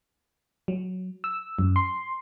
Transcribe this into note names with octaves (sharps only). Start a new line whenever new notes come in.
F#3
E6
F#2
C6